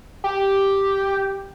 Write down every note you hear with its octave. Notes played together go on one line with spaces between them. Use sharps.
G4